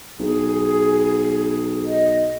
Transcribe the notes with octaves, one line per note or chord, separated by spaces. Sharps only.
B1 G#4
D#5